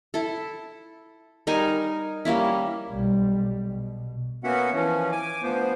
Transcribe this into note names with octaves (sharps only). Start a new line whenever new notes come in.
E4 A4
G3 D#4 A#4 G#5
G3 A#3 C#4 E4
B1 G3
B2
A#3 B3 C#4 F#4 E5 F#5
E3 F3 C#4
G#5 D6
D2 F3 B3 C5